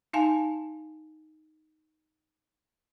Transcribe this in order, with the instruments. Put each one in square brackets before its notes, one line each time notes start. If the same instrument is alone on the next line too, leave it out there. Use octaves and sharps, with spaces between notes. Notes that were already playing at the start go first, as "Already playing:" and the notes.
[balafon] D#4 F5 G#5 A5